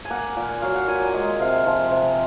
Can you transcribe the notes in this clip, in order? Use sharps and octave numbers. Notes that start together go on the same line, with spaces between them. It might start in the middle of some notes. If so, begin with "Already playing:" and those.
G#5
A#3 F#5
A#2
F#3 F5
F#5
A#2 G#5
G#5
G#3 F#5
C3 F5
F3
C3